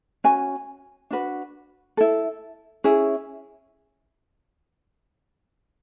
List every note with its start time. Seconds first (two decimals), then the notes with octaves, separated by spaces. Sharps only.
0.24 C#4 F#4 G#5
1.11 D4 F#4 B4
1.97 E4 A4
2.84 C#4 E4 G#4